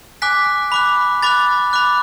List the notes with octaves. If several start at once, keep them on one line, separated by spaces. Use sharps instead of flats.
G#5 D6 F#6 B6
B5 D6 F#6
B5 D6 F#6 A6
B5 D6 F#6